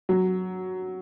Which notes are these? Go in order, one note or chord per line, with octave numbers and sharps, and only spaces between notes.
F#3